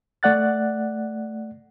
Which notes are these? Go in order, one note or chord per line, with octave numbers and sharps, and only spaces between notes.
A3 D5 F#5 F#6 A6